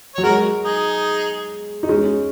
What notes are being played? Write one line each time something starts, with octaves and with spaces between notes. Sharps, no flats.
F#3 C#5
G#3 F#4 A#4
D#4 G#4
D#4
G#3 C#4